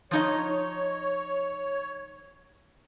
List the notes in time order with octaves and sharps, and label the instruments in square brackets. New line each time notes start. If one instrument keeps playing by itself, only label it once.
[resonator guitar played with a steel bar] F3 D#4 D#5 [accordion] C#5